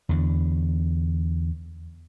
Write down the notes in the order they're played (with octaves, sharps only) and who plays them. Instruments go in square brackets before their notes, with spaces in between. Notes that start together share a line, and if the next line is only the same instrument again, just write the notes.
[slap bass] E2 D3